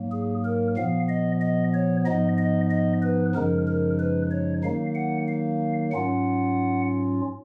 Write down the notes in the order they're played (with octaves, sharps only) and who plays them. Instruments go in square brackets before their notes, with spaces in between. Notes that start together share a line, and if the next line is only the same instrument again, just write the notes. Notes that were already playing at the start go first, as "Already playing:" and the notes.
Already playing: [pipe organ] G#2 F#3 A#3
G#4
A#4
A#2 F3 B3 F5
D#5
D#5
C#5
G#2 F3 B3 D#4 D#5
D#5
D#5
B4
F#2 C#3 F3 G#3 D#4 A#4
A#4
B4
C#5
D#3 F#3 A#3 D#4 F5
F#5
F5
G#2 F#3 C#4 F4 F#5